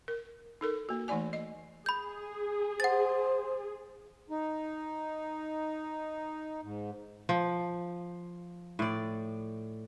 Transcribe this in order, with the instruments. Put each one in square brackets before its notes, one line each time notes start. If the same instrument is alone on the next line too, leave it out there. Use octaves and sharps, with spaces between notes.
[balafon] A#4
D#4 A4 A#4
A#3 F#4
E3 A3 D#4 D5 G#5
D#5
[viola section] G#4 [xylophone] B5 G6
[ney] C5 [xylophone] F#5 A6
[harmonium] D#4
G#2
[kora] F3
A2 D5